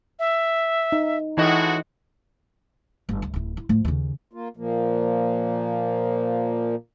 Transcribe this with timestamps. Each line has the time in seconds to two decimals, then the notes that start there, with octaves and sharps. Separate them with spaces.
0.19 E5
0.92 D#4
1.38 A2 E3 G#3 D#4 F#4 D#5
3.09 G1
3.22 D2
3.34 D1 E4
3.57 E4
3.69 A2 F3
3.85 D#2 C#3
4.33 A#3 F4
4.57 A#2 F3 A#3